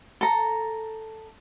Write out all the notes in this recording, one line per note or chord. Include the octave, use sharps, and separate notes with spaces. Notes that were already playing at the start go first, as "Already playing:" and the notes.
A4 A#5